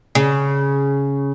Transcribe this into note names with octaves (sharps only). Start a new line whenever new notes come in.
C#3